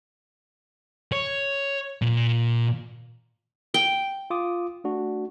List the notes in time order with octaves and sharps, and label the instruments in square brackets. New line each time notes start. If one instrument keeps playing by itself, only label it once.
[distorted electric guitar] C#5
A#2
[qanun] G5
[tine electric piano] F4 D6 D#6
A3 D4 F#4